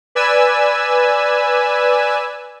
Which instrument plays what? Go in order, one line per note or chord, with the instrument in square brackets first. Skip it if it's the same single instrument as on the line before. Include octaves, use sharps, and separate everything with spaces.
[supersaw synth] B4 D5 G#5 E6